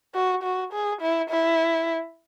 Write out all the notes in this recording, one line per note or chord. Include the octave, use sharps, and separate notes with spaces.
F#4
F#4
G#4
E4
E4